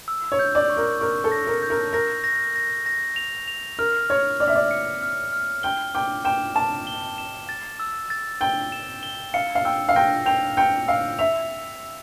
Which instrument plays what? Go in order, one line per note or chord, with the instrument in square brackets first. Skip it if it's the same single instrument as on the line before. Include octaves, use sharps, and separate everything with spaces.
[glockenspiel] E6
[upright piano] C#5
[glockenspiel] G6
[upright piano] D5
[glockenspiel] C#6
[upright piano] A#4
[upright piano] A#4 [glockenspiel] C#6
[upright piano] A4
[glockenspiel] A#6
[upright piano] A#4
[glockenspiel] G6
[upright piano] A#4
[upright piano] A#4 [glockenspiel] A#6
[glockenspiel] A#6
A#6
A#6
F7
F7
[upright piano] A#4 [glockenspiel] F6
[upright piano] C#5 [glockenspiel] F6
[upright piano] D5 [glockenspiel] F6
[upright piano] E5
D5
[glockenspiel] C#7
F6
F6
[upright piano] G5 [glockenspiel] G7
[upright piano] G5 [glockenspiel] D6
[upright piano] G5 [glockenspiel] E7
[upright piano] A5 [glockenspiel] E7
[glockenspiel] G7
E7
A6
E6
A6
[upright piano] G5 [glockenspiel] G7
[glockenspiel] E7
G7
[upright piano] F5 [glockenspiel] C#7
[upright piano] F5
[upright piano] G5 [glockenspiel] E6
[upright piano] F5
[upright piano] G5 [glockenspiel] A#6
[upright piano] G5 [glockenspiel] F7
[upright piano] G5 [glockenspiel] C#7
[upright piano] F5 [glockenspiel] E6
[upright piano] E5 [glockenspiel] F7